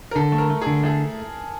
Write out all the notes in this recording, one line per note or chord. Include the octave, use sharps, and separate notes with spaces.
A#4
D3 A4
A3
A#4
A3
D3 G#4
A3 G#4